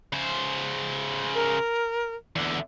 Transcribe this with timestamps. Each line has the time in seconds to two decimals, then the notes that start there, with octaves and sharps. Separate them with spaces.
0.13 C#3 C5
1.34 A#4
2.36 E2 D3